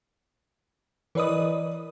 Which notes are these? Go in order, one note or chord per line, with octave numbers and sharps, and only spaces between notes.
E3 A#4 B4 D5 D#5 D#6